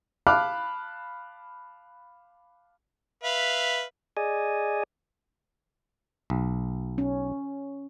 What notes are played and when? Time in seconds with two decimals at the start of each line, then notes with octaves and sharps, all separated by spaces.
0.27 F5 A5 B5 D6 F6 F#6
3.24 B4 E5 F5
4.17 G#4 D5 D#5 G#5
6.30 B1
6.98 C#4